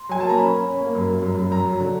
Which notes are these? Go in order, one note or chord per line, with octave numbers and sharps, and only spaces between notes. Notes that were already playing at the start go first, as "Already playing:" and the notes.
Already playing: C6
F#3 G#5
A#3 A5
A#5
C#4 B5
C#4
C#4
A#3
F#2
F#2
F#2
F#2
F#2 A#5
F#3
D3